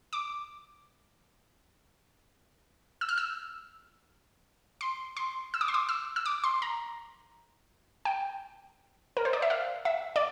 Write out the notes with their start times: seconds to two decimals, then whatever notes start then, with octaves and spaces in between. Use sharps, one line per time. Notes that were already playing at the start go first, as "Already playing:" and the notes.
0.13 D6
3.01 E6
3.09 F6
3.18 E6
4.81 C6
5.17 C6
5.54 E6
5.61 D6
5.68 C6
5.74 D6
5.89 E6
6.16 E6
6.26 D6
6.44 C6
6.62 A#5
8.05 G5
9.17 A#4
9.25 C5
9.33 D5
9.42 E5
9.50 F5
9.85 E5
10.16 D5